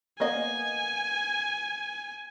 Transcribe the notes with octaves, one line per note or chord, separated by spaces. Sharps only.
A#3 B3 D#5 G#5